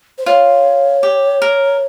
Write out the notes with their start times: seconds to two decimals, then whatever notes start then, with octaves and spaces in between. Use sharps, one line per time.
0.18 C5
0.26 F4 C#5
1.03 G4
1.42 A#4